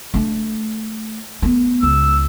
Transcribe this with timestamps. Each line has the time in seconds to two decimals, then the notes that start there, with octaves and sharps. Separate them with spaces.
0.14 A3 D4
1.42 A3 B3
1.83 C#2 E6